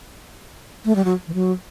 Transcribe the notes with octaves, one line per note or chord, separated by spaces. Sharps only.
A3
G3
F#3
E3
F#3